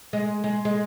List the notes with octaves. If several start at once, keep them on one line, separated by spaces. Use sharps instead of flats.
G#3
G#3
G#3